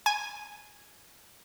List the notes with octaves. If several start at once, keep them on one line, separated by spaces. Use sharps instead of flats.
G#5